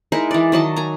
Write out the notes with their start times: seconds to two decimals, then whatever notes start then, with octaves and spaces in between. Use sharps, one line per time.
0.12 G#3 D#4 E4 A#4
0.31 E3 D5
0.52 D#3 F#3 D#5 A5
0.76 G#5 A#5